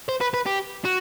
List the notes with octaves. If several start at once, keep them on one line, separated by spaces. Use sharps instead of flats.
C5
B4
B4
G4
F#4